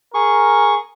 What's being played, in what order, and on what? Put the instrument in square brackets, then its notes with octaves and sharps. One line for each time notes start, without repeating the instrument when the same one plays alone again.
[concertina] G#4 C#6 [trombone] A#4